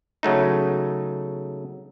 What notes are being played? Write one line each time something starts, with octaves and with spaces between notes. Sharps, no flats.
C#3 F#3 A3 D#4